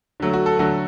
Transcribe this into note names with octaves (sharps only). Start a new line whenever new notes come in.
D3 F#3 A3
F#4
A4
D3 F#3 A3 F#4